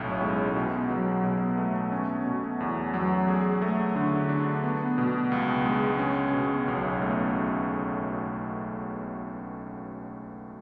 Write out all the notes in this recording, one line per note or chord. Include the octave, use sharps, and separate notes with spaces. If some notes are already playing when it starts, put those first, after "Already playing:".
Already playing: B1 A2 C#4
G#3
B2
F#3
B2
A3
C#4
B2
E2
F#3
G#4
A3
D3
D4
B3
B2
C#2
G#3
C#4
B2
B1
A3